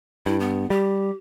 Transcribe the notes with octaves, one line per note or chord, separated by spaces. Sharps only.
G2 E4
B3
G3 G4